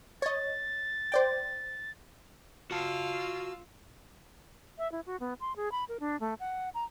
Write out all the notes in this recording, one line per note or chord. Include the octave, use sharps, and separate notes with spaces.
C#5 D#5 A6
C5 D5 G5
F4 F#4 F5 A5 E6
E5
E4
F#4
B3
C6
G#4
B5
A#4
D4
A3
F#5
A#5